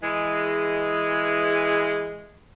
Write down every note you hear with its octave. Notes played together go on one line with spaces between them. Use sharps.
E3 G#3